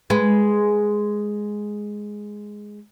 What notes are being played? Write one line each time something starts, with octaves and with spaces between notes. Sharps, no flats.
G#3 B4